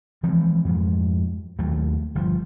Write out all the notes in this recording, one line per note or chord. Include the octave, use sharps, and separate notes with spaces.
E3 F3 G#3 C4
F2 G#2
D#2 F#3 A3
G1 F3